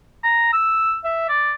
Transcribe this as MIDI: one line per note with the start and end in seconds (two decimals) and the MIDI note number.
0.24 0.50 82
0.53 0.95 88
1.05 1.25 76
1.29 1.53 74